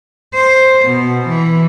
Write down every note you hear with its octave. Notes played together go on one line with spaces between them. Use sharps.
C5
B2
E3